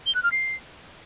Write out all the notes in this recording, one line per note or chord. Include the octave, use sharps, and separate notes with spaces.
G7
F#6
F6
C7